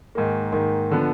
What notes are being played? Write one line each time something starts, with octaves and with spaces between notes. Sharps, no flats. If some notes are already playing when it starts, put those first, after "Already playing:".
G#2 D#3 A#3
G#2 D#3 A#3
D3 F3 B3